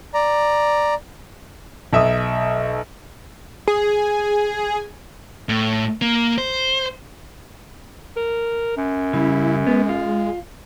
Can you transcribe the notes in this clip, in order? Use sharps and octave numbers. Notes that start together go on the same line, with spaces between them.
D5 A#5
B1 E5 D#6
G#4
A2
A#3
C5
A#4
F#2
C#3 G3 E4
G#3 B3
F4